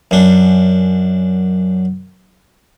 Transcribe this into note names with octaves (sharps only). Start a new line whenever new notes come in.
F#2 D4